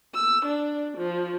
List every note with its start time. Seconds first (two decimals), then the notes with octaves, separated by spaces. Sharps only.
0.15 E6
0.47 D4
0.98 F3